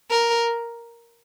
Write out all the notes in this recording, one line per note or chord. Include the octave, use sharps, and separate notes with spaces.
A#4